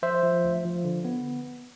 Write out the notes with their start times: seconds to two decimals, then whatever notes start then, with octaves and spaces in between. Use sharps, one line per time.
0.02 F3 C5 E5
0.23 F3
0.44 D2
0.65 F3
0.84 D3
1.05 B3